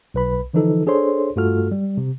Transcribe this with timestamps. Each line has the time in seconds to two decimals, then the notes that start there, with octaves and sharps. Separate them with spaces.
0.14 B1 B4 B5
0.54 D3 E3 F3 D#4 A4
0.87 D4 G#4 A4 C5 C#5 C6
1.36 G2 A3 F4 F#4 A4 F6
1.71 G3
1.97 C3